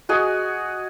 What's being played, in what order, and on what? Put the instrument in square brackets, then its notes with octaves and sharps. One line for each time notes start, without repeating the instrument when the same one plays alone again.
[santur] F#4 G#4 D#5 G#5